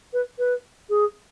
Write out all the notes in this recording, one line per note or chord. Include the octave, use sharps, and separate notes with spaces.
B4
B4
G#4